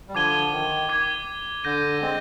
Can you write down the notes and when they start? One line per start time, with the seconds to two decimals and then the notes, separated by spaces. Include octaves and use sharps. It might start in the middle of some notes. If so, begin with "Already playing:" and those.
0.09 G3
0.15 D3 F3 D6 G#6 D#7 G7
0.52 D#3
0.89 D6 G#6 D#7 G7
1.64 D3 G6 A#6 D#7
2.02 G#3 C4